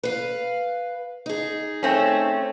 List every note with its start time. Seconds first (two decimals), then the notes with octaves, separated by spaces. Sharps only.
0.03 B4 F5
1.26 D#4 G#4
1.83 A3 C4 C#4